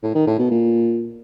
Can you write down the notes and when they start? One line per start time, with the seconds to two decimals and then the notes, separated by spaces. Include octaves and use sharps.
0.03 A2
0.15 D#3
0.27 A2
0.39 B2
0.51 A#2